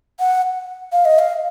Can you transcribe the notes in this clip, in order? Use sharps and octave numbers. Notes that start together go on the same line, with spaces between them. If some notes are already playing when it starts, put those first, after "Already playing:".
F#5
F5
D#5
F5